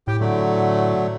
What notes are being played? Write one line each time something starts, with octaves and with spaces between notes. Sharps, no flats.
A2 G4 G5
D3 F#3 A3